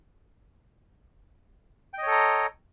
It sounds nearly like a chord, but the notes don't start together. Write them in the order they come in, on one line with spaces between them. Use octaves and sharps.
G5 D#5 C#5 A4 A#5